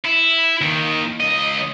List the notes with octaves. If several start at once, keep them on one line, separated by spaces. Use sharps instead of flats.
E4
D#2 D#3
C#2 D#5